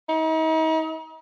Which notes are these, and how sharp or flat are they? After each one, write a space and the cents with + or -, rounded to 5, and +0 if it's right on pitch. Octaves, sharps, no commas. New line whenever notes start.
D#4 +40